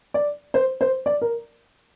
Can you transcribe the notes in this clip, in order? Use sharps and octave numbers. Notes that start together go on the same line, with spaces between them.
D5
C5
C5
D5
A#4